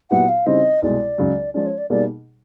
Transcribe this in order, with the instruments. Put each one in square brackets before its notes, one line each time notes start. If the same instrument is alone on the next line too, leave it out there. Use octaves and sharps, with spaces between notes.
[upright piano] A#2 F#3 B3 E4 G4 [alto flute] F#5
[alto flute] F5
[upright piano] C#3 E3 G3 C4 D#4 [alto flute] D#5
[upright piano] C2 B2 G#3 [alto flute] D5
[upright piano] C#2 C#3 F#3
[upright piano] F3 G#3 C#4 [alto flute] D5
[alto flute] C#5
D5
[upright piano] B2 G3 A#3 D#4 G#4 [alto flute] D5